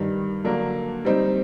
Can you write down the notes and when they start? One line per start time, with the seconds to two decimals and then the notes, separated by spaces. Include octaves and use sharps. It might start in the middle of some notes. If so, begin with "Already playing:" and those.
Already playing: G2 D#3 G3
0.44 D3 F#3 A#3 D4
1.05 G3 C4 D#4